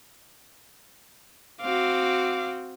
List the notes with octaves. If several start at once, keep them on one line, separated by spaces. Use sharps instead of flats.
C4 F#4 F5 D6